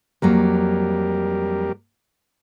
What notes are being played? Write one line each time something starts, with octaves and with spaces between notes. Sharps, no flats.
F2 F#3 G3 A#3 G4 A#4